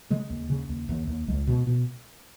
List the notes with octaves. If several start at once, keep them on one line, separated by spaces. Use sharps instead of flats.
C#3 G#3
D#2
C#3
D#2
D#2
D#2
C#2 G#3
B2
B2